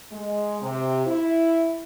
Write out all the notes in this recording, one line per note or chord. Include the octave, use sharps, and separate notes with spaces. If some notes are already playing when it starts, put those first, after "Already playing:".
G#3
C3
E4